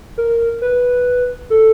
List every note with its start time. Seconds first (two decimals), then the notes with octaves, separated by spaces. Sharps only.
0.18 A#4
0.62 B4
1.50 A4